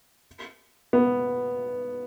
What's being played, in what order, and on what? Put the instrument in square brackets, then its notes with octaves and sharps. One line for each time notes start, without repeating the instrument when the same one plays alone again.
[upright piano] B3